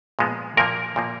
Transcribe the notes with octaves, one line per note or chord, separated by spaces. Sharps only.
A#2 F3 G#3 B3
A#2 F3 A#3 A#4
A#2 F3 A#3